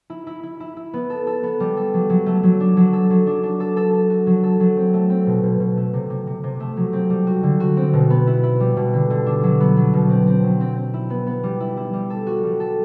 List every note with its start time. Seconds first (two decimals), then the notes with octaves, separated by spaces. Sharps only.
0.10 E4
0.27 E4
0.43 E4
0.60 E4
0.77 E4
0.93 B3
1.10 A4
1.27 A4
1.43 B3
1.60 G3
1.77 A4
1.94 F#3
2.10 F#3
2.26 A3
2.43 F#3
2.60 D4
2.77 F#3
2.93 A4
3.10 F#3
3.27 D4
3.43 D4
3.60 A4
3.77 A4
3.94 A4
4.10 F#4
4.27 F#3
4.43 A4
4.60 F#3
4.77 C4
4.94 A3
5.10 C4
5.27 B2
5.43 B2
5.60 B2
5.77 A3
5.93 C3
6.10 C3
6.27 C3
6.43 C3
6.60 A3
6.77 F#3
6.93 C4
7.10 G3
7.27 F#4
7.43 D3
7.60 F#4
7.77 C4
7.93 B2
8.10 B3
8.27 E4
8.43 E4
8.60 G3
8.77 B2
8.93 D3
9.10 D3
9.26 D4
9.43 F#3
9.60 B3
9.77 F#3
9.93 B2
10.10 C4
10.27 C4
10.43 F#3
10.60 C4
10.77 C4
10.94 E4
11.10 B3
11.27 B3
11.43 G3
11.60 E4
11.77 E4
11.93 G3
12.10 A4
12.27 F#4
12.43 G3
12.60 A4